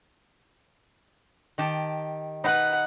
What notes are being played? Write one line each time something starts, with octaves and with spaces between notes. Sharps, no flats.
D#3 G4 A5
D#4 B4 F#5